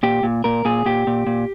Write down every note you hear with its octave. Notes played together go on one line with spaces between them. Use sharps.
A#2 G4
A#2
A#2 A#4
A#2 G#4
A#2 G4
A#2
A#2